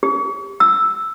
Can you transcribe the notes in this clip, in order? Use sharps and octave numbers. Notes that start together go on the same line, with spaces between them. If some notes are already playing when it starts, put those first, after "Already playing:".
G4
E6